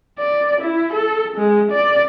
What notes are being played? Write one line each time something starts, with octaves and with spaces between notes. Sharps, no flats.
D5
E4
A4
G#3
D5